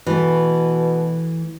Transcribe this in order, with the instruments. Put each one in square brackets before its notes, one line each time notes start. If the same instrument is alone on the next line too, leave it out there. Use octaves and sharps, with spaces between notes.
[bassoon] B2 [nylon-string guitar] E3 A3